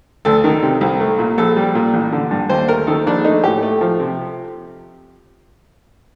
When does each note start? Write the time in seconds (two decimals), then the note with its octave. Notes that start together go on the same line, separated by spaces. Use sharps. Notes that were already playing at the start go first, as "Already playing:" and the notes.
0.25 D2 A4
0.44 D#3
0.63 C3
0.81 C2
1.00 A3
1.19 A#2
1.38 A#1 A4
1.56 G3
1.75 A#2
1.94 A1
2.12 D3
2.31 G2
2.49 D#2 C5
2.68 A3 A#4
2.87 D#3 A4
3.06 A#1 D4
3.24 A3 D#4
3.44 A2 G4
3.63 A3
3.81 F3
4.00 C3